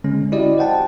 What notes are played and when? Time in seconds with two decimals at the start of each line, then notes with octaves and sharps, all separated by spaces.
0.04 D3 G#3 C#4
0.32 E4 F#4 G4 D5 D#5
0.58 C5 F#5 G5 A5